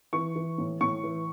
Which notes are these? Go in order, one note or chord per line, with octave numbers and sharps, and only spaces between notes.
E3 C#6
E3
A2
A2 C#6
E3